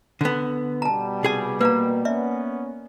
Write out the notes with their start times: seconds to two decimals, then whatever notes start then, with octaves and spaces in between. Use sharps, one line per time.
0.21 D3 B3
0.82 B2 G3 A5 A#5
1.23 C2 G#4 G#5
1.61 A#3 B4 F5 A#5
2.05 B3 C#4 D5 E5